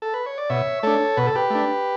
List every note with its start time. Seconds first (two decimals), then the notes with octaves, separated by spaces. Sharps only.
0.02 A4
0.14 B4
0.26 C#5
0.38 D5
0.50 B2 C#5 E5
0.83 A3 D4 A4 C#5
1.17 B2 B4
1.27 A4
1.35 G4 B4
1.50 A3 D4